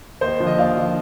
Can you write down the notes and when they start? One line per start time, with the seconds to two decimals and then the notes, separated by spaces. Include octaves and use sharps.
0.21 D#2 C5 D#5
0.40 D3 F3
0.47 D#5
0.58 D#2 D5 F5
0.76 D3 F3